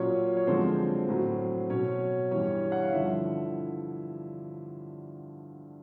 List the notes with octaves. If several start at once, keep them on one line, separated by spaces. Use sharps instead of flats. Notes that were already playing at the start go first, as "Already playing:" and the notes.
Already playing: A#2 F#3 C#4 C#5
C#5
F#2 D3 F3 G#3 C4 C5
A2 F#3
B2 F#3 C#4 C#5
G2 E3 G3 C#4 C#5
F#5
F5
G2 D3 F3 E4 E5